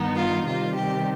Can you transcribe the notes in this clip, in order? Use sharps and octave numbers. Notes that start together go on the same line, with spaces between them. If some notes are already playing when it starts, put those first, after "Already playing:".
Already playing: G2 D#3 B3 D#4
F4
C3 D#3 G3 F4
G4